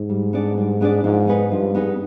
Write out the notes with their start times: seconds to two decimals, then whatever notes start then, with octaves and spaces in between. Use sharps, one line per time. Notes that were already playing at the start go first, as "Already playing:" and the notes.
Already playing: G#2
0.09 G3
0.33 B3 D4 G#4 D5
0.57 G3
0.81 B3 D4 G#4 D5
1.04 G#2 F3
1.27 B3 D#4 G#4 B4
1.51 G2 F3
1.75 B3 D#4 G#4 B4